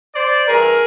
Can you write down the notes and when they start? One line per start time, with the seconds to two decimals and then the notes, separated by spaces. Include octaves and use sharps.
0.15 C5 D5
0.48 G2 E3 G#4 A#4